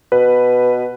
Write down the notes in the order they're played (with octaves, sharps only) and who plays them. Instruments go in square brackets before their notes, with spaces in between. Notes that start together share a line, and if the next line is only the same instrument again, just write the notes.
[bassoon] B2 [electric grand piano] B4